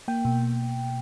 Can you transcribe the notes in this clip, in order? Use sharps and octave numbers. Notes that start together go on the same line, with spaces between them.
A#3 G5
B2